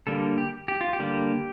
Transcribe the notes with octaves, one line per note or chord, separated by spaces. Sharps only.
D3 G3 A#3 A4
G4
G4
F4
G4
D3 G3 A#3